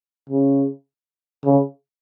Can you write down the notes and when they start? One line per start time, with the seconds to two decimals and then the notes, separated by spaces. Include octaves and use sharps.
0.30 C#3
1.45 C#3